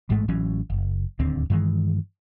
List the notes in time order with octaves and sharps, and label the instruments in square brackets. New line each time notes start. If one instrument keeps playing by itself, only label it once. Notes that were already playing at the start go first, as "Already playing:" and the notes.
[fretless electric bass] A1 G#2 G#3 A3
A1 E3 F#3 C#4
F#1
D1 D#2 D3 C4
G2 D#3 E3 G#3